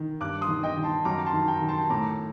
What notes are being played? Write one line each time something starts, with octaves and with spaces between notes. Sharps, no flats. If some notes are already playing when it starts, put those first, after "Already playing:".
Already playing: D#3
G2 D6 F#6
C6 D#6
D#3
D#5 G5
D#3
A5 C6
F#2 A#5 D6
A5 C6
D#3
G5 A#5
D#3
A5 C6
A2 A#5 D6